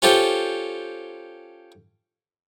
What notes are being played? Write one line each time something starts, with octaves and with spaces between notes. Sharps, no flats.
C#4 F4 G4 A4 C5